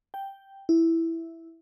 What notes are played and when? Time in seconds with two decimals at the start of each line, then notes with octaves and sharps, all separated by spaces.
0.14 G5
0.69 E4